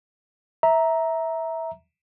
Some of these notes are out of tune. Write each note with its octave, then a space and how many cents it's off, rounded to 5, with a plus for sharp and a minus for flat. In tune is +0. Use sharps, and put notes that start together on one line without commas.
E5 -15 A#5 +0